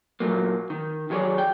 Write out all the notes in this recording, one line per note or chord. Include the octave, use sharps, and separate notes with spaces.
A#2 F3 F#3 A#3
D#3
D#3 F#3 G#4 B4 C#5 D5
G5